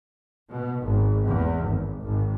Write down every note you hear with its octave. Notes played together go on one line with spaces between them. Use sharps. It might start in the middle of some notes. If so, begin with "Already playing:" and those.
B2
G#1
E2
G#1
G#1